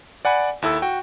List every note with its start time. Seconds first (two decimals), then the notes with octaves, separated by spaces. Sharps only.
0.25 D5 F#5 G#5 B5
0.62 D#2 E4 A4 E6
0.82 F#4 G5